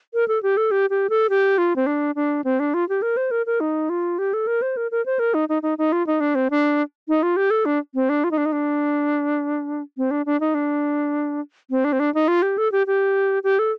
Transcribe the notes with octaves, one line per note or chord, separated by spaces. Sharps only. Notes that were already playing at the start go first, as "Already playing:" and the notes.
A#4
A4
G4
A4
G4
G4
A4
G4
F4
C4
D4
D4
C4
D4
F4
G4
A#4
C5
A#4
A#4
D#4
F4
G4
A4
A#4
C5
A#4
A#4
C5
A#4
D#4
D#4
D#4
D#4
F4
D#4
D4
C4
D4
D#4
F4
G4
A4
D4
C4
D4
F4
D#4
D4
D#4
D4
C4
D4
D4
D#4
D4
C4
D4
C4
D4
D#4
F4
G4
A4
G4
G4
G4
A4